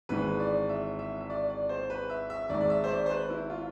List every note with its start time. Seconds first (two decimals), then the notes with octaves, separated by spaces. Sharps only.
0.09 G#1 G#2 E3 G#3 B4
0.40 D5
0.69 E5
0.99 E5
1.21 E5
1.30 D5
1.50 D5
1.69 C5
1.90 B4
2.10 E5
2.30 E5
2.49 G#1 G#2 G#3 D5
2.61 D5
2.70 E5
2.84 C5
2.90 D5
3.06 C5
3.10 B4
3.30 E4
3.50 F4